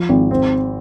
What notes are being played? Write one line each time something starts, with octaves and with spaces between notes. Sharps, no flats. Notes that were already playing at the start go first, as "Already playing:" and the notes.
Already playing: F3
G#1
C4